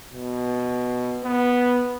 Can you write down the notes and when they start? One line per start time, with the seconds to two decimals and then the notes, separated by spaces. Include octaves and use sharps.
0.14 B2
1.24 B3